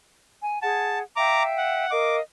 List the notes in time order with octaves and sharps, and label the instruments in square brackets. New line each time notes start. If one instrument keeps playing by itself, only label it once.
[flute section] G#5
[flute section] G#4 F#5 [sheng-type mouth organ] A5
[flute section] E5 F5 G5 [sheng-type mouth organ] A#5 D6
[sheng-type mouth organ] F#5
[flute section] A#4 D#5 F5 [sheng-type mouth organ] D6